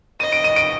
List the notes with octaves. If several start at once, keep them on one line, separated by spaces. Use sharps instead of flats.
D#5 D#7
D7
D#7
D7